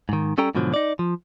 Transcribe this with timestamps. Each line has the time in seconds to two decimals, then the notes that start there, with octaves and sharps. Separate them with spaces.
0.09 G#2 D#3
0.38 G3 C#4 A4 G5 A#5
0.55 G#2 B2 D3 F3 F#3
0.74 D#4 D5
0.99 F3